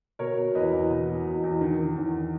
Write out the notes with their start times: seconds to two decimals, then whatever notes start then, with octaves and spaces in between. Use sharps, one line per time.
0.19 B2 A#4 C#5
0.37 B2
0.55 E2 B4 D#5
0.73 E2
0.90 B2
1.09 B2
1.26 E2
1.43 E2
1.61 D#3
1.79 D#3
1.96 E2